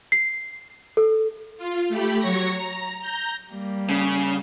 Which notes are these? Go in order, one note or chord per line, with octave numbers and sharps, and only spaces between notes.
C7
A4
F4
A3 G4 B5
F#3 C#5 C#6 A#6
A#5
A#5 G6
G3 A#3
C#3